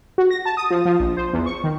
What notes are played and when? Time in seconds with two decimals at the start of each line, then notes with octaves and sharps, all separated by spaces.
0.18 F#4
0.31 A#6
0.46 A5
0.57 D#6
0.71 F3
0.85 F3
1.00 A#1
1.17 C5
1.33 E2
1.46 C#6
1.64 D#3